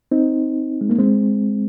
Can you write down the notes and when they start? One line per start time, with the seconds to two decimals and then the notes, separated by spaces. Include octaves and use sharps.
0.11 C4 D#4
0.81 G#3
0.90 A#3
0.98 G#3 C4